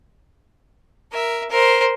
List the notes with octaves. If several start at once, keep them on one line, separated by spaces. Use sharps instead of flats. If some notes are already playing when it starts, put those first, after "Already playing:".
A#4 E5
A#4 C5